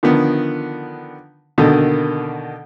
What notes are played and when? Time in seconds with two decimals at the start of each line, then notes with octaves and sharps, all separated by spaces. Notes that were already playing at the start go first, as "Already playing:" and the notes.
0.03 D3 D#3 F3 B3
1.58 B2 D3 D#3 A#3 A4